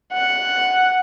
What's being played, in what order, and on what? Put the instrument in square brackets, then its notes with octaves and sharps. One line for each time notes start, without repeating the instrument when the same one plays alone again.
[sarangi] F#5